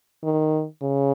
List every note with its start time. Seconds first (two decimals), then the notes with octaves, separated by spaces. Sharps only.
0.24 D#3
0.83 C#3